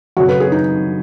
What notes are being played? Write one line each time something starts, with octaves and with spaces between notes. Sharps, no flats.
F#2 C#3 F#3 F#4
B4
G#4
D#4